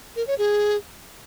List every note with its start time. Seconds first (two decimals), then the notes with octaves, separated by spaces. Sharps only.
0.16 A#4
0.27 C#5
0.38 G#4